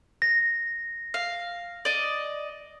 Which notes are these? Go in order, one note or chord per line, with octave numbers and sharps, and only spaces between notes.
A#6
F5
D5 D#5